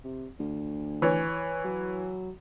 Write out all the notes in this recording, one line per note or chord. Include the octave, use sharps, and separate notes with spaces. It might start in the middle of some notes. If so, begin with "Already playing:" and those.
C3
D2
E3 C#5
F#3